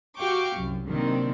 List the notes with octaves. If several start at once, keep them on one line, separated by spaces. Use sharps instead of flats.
F#4 G4 F5 G5 C#6 D6
C2 F#2
C3 D#3 F#3 A#3 C4 D4